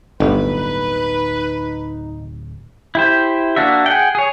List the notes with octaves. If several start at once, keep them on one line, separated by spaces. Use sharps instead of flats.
D1 G1 D#4 B4
E4 G4 C5
A#3 D4 F#4 E5
G#4 F#5 G5
G#4 C#5